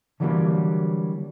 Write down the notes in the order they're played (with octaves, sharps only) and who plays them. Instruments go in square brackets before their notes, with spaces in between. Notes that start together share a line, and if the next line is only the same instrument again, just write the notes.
[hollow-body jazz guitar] D3 E3 F#3 G3 A3 A#3